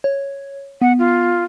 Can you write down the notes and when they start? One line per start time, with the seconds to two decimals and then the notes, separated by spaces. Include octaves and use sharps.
0.04 C#5
0.82 B3 F#5
0.99 F4